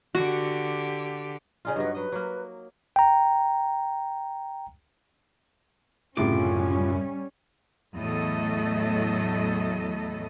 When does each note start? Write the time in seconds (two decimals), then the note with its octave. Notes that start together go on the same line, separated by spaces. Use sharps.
0.15 D3 F#4 G4
1.65 C#3 D#4 F4 D5 G#5
1.76 G2 F#3 B4 D#5 F#5
1.95 F#3 B4 D#5
2.12 F#3 A#3
2.96 G5 A#5
6.17 C2 F#2 A2 C#3 G3 C#4 F4 D6
7.97 E2 A2 F#3 A3 A4 D#5